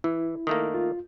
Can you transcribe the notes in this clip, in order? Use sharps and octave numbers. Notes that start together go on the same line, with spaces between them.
E3 E4
D#3 A3 A#3
F4